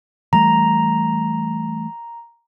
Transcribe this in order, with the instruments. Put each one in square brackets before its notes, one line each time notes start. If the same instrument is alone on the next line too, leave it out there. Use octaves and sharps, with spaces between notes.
[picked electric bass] E3 G3 A3 [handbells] A#5